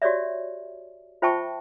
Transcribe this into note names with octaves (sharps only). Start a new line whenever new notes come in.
F#4 G4 C#5 D5 E5
F4 C5 E5 G5 A5 C#6